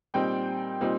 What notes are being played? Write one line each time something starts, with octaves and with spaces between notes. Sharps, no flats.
A#2 G3 C4 D#4 G5
A#2 G3 C4 D#4